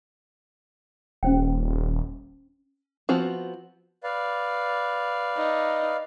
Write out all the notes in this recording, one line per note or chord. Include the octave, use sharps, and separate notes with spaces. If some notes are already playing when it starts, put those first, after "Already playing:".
D#1 C#4 C5 G5
F3 B3 C4 F#4
B4 D5 F5
D#4